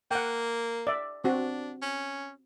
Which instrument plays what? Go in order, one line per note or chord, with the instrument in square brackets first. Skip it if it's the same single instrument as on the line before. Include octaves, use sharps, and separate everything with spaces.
[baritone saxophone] A#3 [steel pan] F#5 G5
[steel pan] D5 E5
[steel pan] C4 F#4 [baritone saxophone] D4
[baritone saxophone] C#4